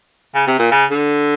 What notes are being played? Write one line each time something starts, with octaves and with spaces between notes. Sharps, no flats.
C#3
C3
A#2
C#3
D3